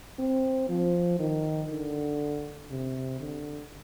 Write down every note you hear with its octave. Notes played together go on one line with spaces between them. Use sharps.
C4
F3
D#3
D3
C3
D3